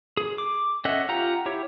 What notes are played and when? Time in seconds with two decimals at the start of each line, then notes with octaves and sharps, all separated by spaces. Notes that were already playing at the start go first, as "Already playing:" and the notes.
0.17 G#4
0.38 D6
0.85 C#4 A4 D#5 E5 F#5
1.09 F4 G4 F#5 A#5
1.46 E4 G4 C#5